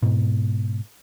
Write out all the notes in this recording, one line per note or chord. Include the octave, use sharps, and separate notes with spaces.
G#2 B2